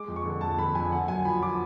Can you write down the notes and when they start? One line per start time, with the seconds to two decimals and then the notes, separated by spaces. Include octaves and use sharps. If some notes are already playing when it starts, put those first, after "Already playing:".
Already playing: G#3 D6
0.08 F2
0.16 C#6
0.25 D3
0.41 F2 A5
0.58 D3 B5
0.75 F2 G#5
0.92 D3 F#5
1.08 F#2 G#5
1.25 F3 B5
1.42 F3 D6